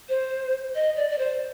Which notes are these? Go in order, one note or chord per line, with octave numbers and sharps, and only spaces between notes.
C5
D#5
D5
D5
C5